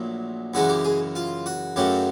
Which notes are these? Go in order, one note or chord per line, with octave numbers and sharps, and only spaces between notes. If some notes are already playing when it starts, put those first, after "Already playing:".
Already playing: A#1 A#2 F#3 A3
F#2 C#3 E3 G#3 F#4
G4
G#4
F4
F#4
F#2 C#3 F#3 A3 G4